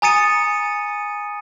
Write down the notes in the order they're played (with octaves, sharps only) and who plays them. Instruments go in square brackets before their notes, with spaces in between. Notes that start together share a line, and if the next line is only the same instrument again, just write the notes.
[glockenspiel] G#5 A#5 D#6 A6 C#7 D#7